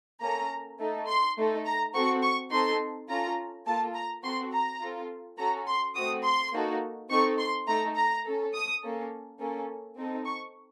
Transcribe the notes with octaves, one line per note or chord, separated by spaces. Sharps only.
A#3 C#4 A4 A#5
A3 D#4 A4
C6
A3 D#4 A4
A#5
C4 F#4 A4 C#6
C#6
C4 D#4 A4 C6
C#4 F4 A4 A#5
A#3 F4 A4 A5
A#5
C4 F#4 A4 C6
A#5
C4 F4 A4
C#4 F#4 A4 A#5
C6
A3 C4 F#4 D#6
C6
A#3 D#4 F#4 A4
C4 D#4 A4 C#6
C6
A3 D#4 A4 A#5
A#5
C#4 A4
D#6
A#3 C#4 A4
A#3 C#4 A4
C4 D#4 A4
C#6